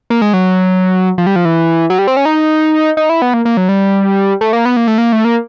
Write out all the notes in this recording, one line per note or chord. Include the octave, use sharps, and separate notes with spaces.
A#3
G#3
F#3
F3
G3
F3
E3
F#3
G3
C4
C#4
D#4
D#4
E4
B3
A#3
A#3
F#3
G3
A3
A#3
B3
A#3
A3
A#3
A3
A#3